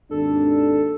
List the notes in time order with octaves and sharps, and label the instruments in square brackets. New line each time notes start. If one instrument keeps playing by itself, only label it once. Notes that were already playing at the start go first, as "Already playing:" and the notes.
[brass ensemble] G#1 D#2 D4 [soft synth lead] A4